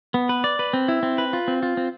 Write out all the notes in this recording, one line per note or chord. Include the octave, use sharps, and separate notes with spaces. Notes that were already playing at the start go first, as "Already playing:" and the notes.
B3
B4
D5
B4
C4
E4
C4
B4
F4
C4
F4
C4